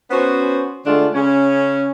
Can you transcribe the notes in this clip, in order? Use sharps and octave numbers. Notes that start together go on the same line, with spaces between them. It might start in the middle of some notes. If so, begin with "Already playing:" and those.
B3 C#4 F#4 C5
D3 G#3 A3 D4 F4
C#3 C#4